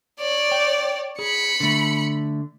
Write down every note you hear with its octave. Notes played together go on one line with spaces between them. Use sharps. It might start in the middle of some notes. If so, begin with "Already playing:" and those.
C#5 D5
G5
G#4 B5 C#7
D3 A3